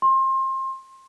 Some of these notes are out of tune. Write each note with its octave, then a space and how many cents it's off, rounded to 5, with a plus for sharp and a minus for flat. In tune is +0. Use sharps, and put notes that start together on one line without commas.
C6 +30